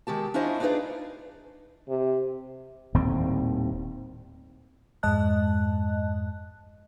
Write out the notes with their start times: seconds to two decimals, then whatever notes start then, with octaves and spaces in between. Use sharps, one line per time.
0.07 D#3 G#3 G4 A5
0.34 C#4 D4 E4 F4 C5 D#5
0.60 D4 D#4 F4 G#4 B4 D5
1.89 C3
2.94 D#1 D#2 A2 C4
5.03 F2 G#2 G#3 D#5 A5 F#6